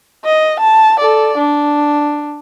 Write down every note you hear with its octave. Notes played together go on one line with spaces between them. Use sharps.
D#5
A5
A4 D5
D4